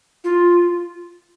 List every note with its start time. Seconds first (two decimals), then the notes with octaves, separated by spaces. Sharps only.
0.24 F4